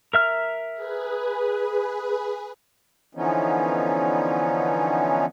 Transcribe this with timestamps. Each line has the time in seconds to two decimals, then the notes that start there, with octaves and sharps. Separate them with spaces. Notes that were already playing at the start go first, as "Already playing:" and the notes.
0.14 A#4 E5 F6
0.72 G#4 B4
3.15 D3 E3 F3 B3 C#4 D#4